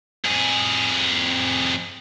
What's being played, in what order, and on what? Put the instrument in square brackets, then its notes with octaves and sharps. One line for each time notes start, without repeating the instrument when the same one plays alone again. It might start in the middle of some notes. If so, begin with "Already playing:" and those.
[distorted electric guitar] F2 G#4